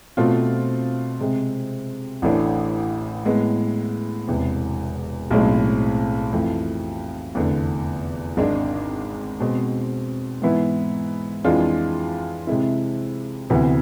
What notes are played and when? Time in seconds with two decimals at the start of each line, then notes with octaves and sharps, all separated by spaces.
0.17 B2 A3 C4 F4
1.20 C3 G#3 C4
2.22 A1 A2 E3 A3 D4
3.25 A2 G#3 B3
4.27 E1 E2 C3
5.31 B1 A2 G#3 C4
6.33 F2 E3 A3
7.35 F1 E2 D3 A3 D4
8.37 G#1 G#2 G#3 D4 G#4
9.40 B2 G#3 C4
10.42 G#2 E3 B3 E4
11.44 F2 E3 G#3 D4 F4
12.47 C3 G#3 C4 E4
13.50 D2 C3 E3 B3